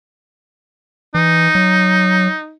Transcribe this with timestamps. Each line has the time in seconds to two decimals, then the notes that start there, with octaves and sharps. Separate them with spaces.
1.15 E3 D#4
1.55 F#3